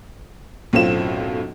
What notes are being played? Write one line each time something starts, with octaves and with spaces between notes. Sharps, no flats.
B1 F#2 A2 C4 F4 E7